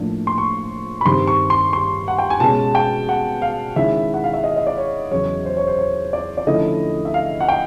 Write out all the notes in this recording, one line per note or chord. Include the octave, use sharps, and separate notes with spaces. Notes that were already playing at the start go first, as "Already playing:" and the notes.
Already playing: A2 F3 A#3 D4
C6
C#6
B5
G2 D#3 G3 C4 C6
C#6
C6
C6
F#5
G5
G#5
B2 G#3 C#4 A5
G5
F#5
F5
D#3 G#3 C#4 E4 E5
F#5
F5
E5
D#5
D#5
D5
C#5
E2 C#3 F#3 C#5
C5
C#5
C5
C#5
D5
D5
D3 F3 A3 C#4 E4 D#5
E5
F5
F#5
G5